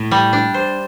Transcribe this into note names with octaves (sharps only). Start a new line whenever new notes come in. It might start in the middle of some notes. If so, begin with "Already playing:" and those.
Already playing: A2
G3
D4
C5